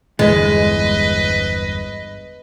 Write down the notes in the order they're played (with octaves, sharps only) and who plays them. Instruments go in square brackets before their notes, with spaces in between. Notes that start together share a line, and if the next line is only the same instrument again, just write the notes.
[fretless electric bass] G1 E2 G2 [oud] G#3 [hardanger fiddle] B4 D#5